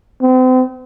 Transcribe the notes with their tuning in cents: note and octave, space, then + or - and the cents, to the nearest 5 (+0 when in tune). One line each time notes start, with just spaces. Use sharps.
C4 -40